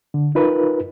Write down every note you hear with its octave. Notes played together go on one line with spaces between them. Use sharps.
D3
D#4 F4 A#4 B4